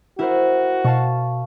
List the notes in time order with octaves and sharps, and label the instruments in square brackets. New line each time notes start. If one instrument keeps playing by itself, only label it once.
[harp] E4 A#4 C5 [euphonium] F#4
[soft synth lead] B2 [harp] F5 A5 C#6